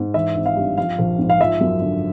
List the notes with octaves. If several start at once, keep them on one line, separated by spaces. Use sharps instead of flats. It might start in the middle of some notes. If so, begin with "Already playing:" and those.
Already playing: G#2
E3 E5
G#1
F5
G2
F3 F5
A#1
G#2
F5
F3 E5
F#2
D3